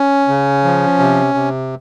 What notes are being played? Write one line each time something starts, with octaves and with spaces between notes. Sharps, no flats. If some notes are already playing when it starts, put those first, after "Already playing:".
Already playing: C#4
C#3
F3
C3
C3